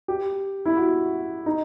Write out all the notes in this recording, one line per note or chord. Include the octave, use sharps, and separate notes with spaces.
G4
E4
F#4
D#4